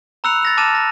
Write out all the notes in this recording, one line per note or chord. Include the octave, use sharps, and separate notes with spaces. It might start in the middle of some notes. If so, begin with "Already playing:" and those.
A#5 B5 E6 F#6 C#7 F7
A6 A#6 F7
A5 D6 F6 A6 D#7 E7
A#6